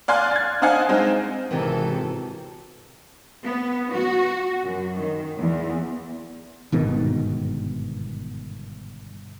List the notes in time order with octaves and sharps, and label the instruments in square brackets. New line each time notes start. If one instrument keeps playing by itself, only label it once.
[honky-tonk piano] D5 F5 G#5 C6 F6 F#6
G#6 A6
C4 D4 D#5 F5 F#5 G#5
G#3 C4 D#4
[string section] G#1 A4 [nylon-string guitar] C3 D#3 E3
[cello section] B3
F#4
F#2
D#3
E2
[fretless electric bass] G1 G#2 B2 D#3